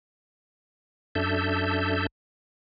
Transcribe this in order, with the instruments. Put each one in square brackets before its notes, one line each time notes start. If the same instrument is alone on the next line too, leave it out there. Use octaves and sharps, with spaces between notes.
[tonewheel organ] F#2 D4 A4 E5 G6